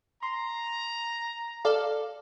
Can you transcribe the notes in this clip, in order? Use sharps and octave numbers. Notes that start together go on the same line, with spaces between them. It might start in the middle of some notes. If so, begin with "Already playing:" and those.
A#5 C6
A4 D5 F5